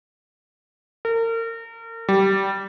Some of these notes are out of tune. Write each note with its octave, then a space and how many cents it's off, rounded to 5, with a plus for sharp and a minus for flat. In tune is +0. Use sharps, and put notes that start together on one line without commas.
A#4 -35
G3 -15